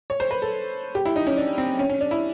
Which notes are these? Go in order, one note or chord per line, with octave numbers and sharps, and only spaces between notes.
C#5
C5
B4
A4
G4
E4
D#4
C#4
D4
C4
C#4
C#4
D4
E4